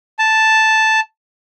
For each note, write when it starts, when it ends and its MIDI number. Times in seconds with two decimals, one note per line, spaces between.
0.19 1.00 81